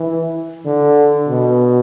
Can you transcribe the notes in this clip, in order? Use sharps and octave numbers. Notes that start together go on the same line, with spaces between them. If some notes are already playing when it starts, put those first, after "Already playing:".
Already playing: E3
D3
B2